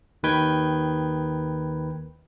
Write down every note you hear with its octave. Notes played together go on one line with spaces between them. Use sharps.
D#2 D#3 B4 G5 G6 G#6